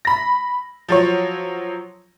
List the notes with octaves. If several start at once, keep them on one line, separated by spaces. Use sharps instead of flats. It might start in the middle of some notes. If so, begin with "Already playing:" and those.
B5 A#6
F3 F#3 C#5